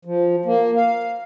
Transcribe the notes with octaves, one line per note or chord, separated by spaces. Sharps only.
F3
A#3
F5